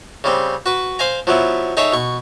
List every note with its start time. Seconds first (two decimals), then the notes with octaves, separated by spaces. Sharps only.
0.24 C#3 G3 C4
0.66 F#4 B4
0.99 C5 F5 G#5 A#5
1.27 F3 F#3 B3 E4
1.77 D#4 G#4 A4 C#5 E5
1.92 B2 C#6